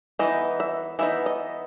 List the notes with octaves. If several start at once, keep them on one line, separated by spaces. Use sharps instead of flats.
E3 B3 D#4 D#5
E5
E3 B3 D#4 E5
D#5